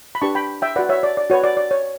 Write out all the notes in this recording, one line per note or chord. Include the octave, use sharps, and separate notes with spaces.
B5
D4 G4 B4 A5 C#6
G5 B5
E5 G5
F#4 B4 D5 F#5
C#5 E5
D5
D5
F#4 B4 C#5
D5
D5
C#5